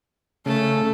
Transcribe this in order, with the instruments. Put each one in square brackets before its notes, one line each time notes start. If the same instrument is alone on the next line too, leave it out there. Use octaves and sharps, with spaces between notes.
[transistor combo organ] C#3 [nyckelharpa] A3 A4